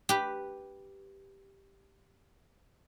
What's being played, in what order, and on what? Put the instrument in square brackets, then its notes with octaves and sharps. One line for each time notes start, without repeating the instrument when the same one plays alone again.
[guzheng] G4 B4